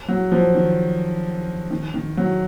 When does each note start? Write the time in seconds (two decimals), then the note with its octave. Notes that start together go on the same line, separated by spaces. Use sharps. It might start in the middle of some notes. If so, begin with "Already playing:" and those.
0.08 F#3
0.32 F3
0.55 D#3
1.70 D#3
1.94 D#3
2.17 F#3